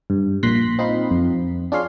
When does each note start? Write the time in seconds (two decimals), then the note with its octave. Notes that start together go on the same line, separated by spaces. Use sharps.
0.10 G2
0.43 A#1 A#2 C6 F#6 A#6 B6
0.79 C4 D#4 F4 B5 C7
1.11 F2
1.72 D4 F4 G#4 C#5 F5 C6